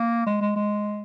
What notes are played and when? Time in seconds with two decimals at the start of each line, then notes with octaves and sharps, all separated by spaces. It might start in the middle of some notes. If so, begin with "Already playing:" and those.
Already playing: A#3
0.26 G#3
0.41 G#3
0.56 G#3